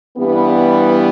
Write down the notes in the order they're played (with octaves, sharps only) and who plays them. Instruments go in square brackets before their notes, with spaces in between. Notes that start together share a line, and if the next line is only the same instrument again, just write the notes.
[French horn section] G2 E3 G3 B3